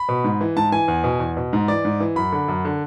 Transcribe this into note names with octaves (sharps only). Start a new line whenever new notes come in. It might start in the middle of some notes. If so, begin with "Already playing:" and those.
Already playing: B5
B2
G#2
E3
G#2 A5
E3 G#5
E2
B2
E2
B2
G#2
E3 D5
G#2
E3
F#2 B5
D3
F#2
D3